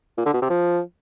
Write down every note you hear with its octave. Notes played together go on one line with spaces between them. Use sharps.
A#2
D3
B2
C3
F3